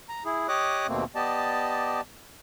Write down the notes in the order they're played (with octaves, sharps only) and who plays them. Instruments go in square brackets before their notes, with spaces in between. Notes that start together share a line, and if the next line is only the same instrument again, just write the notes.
[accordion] A#5
E4 G#4
G4 C#5 D#5 D6 D#6 F#6
D#2 B2 A3 A#3 C4
B3 G4 D5 D#5 A5